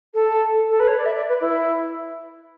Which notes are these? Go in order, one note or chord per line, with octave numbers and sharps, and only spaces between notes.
A4
A4
B4
C#5
D5
E5
D5
B4
E4